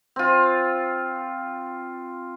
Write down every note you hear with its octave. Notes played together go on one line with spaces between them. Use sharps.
C4 F4